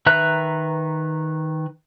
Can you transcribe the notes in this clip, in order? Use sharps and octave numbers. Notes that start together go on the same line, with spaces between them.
D#3 B4 E5 A#5 F#6